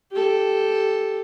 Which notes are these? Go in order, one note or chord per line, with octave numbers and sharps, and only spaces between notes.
G4 A4